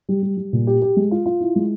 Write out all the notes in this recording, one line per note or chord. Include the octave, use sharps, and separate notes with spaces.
G3
G3
G3
A#2
G4
G4
G#3
F4
F4
E4
G#3